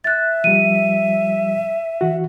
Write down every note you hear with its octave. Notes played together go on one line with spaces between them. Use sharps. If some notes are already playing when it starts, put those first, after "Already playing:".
E5 F#6 A6
F3 G3 D#7
E3 F#4